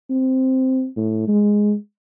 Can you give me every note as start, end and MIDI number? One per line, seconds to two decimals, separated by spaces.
0.10 0.87 60
0.96 1.26 45
1.27 1.75 56